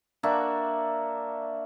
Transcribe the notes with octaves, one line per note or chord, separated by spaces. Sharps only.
A#3 D4 F#4 E5